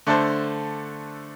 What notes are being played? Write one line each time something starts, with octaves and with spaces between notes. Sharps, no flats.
D3 A3 D4 A4 C5